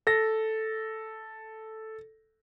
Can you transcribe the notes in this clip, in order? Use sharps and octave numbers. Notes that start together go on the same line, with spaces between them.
A4 A#6